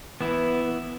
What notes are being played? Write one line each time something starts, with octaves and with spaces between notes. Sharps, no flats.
E3 B3 E4